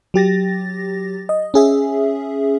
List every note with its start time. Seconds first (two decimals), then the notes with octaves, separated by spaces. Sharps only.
0.14 F#3 G4 A6 A#6
1.29 D#5
1.54 C#4 G#4 E5